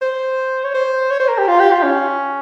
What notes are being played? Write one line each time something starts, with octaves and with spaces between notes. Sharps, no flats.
C5
C#5
C5
C#5
C5
A#4
G4
F4
G4
F4
C#4